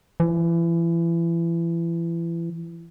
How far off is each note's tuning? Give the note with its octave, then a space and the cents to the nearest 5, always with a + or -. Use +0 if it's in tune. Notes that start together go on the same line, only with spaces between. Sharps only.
E3 +30